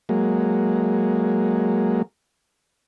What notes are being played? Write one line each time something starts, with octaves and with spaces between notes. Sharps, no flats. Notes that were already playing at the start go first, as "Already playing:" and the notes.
F#3 G#3 A#3